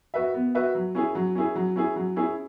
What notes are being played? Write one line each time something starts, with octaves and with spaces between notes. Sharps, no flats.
F#4 B4 E5
B3
F#4 B4 E5
F#3
C#4 E4 G#4
F#3
C#4 E4 G#4
F#3
C#4 E4 G#4
F#3
C#4 E4 G#4